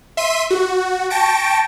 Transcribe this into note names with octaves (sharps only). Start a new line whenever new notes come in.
E5 C6 B6 D#7
F#4
G5 A5 C#6 A#6 D7